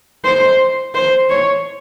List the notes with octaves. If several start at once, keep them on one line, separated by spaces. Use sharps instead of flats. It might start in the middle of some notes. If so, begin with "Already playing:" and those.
C5
C5
C#5